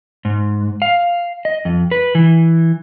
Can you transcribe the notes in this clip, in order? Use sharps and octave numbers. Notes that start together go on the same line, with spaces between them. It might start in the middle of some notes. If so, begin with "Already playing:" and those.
G#2
F5
D#5
F2
B4
E3